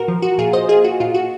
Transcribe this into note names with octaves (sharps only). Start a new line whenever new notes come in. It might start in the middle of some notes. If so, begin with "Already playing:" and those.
Already playing: A#2 F#4 A#4
F3
F#4
A#2 F4 G#4
C5 D#5
A#3 F4 G#4
F#4
A#2 F4
F#4